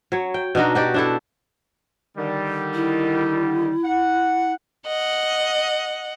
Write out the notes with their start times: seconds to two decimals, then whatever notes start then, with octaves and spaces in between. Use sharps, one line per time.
0.12 F#3 C#5
0.34 G5
0.55 B2 D4 D#4 F#4
0.75 F#4 G4 D5
0.94 D4 E4 A4
2.18 D3 D#3 G3
2.74 E4
3.84 F#5
4.87 D#5 F#5